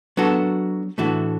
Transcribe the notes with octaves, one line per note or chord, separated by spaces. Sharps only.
F#3 B3 D4 F#4 A4
A2 E3 A3 D4 F#4